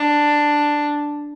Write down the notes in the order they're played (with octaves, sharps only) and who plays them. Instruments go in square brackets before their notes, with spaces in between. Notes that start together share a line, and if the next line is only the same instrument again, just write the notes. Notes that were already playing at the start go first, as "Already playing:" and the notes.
Already playing: [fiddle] D4